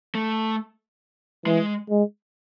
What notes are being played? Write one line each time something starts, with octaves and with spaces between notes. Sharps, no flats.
A3
E3 G#3
G#3